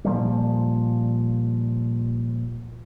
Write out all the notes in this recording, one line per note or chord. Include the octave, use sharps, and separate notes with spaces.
A#2 F3 G3